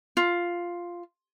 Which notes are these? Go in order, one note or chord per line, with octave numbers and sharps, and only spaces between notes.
F4